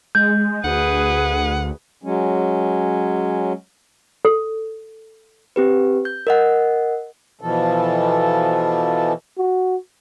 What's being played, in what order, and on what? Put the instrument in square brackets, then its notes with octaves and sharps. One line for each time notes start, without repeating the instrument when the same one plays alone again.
[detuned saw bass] G#3 [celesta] G6
[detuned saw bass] D2 [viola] G#4 B4 [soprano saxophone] F#5
[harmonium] F#3 G#3 C#4
[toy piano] A4
[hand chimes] C4 G4 B4
G6
A#4 D#5 F#5
[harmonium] B2 E3 F3 A4
[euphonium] F#4